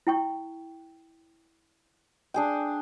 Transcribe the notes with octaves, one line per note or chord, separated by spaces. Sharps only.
E4 G5 C#6
D4 G#4 G5